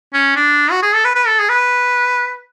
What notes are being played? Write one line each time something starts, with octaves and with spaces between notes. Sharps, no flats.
C#4
D4
F#4
G#4
A4
B4
B4
A4
G#4
B4